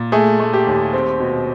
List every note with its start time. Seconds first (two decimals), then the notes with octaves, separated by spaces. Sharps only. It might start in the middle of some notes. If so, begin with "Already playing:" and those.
Already playing: A#2
0.12 A3 G#4
0.40 A3
0.53 G4
0.67 D#2
0.93 C4
1.20 B2